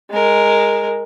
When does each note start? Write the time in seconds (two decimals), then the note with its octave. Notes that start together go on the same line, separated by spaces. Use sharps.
0.11 G#3 A#4